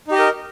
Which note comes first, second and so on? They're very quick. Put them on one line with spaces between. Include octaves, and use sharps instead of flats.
D#4 G4 D#5 A#4